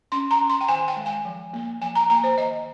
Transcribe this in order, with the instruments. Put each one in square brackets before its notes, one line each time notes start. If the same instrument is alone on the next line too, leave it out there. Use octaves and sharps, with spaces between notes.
[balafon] C#4 C6
A#5
C#4
C6
G5
D#3 G#5
G5
G#3
G#5
F3
A#3
F3 G#5
A#5
A#3 A#5
C5
D#3 D#5